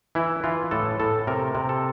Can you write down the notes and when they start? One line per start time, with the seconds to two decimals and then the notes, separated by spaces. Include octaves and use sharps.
0.15 E3 E4
0.44 E3 F4
0.71 A2 A4
1.00 A2 A4
1.27 C3 A#4
1.55 C3
1.69 A4